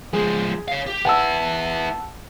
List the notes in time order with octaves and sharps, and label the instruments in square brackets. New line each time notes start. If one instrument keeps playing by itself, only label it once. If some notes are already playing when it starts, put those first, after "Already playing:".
[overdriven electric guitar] F3 G#3 [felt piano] G#4
[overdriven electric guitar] C#5 F5
G4
[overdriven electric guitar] B3 E4 [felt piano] F#5 A5 E6